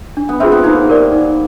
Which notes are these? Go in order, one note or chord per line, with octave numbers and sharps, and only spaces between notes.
D4
B3
C4 F4 G#4 C5 E5
B3
A#3 D#4
G4 A#4 D5
D#4